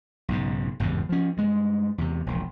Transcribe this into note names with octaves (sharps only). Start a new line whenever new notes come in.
B1 G#2 C#3
G#1 E2 G2 C#3
F3 C#4
G2 G#3
E2 C3
E1 A#1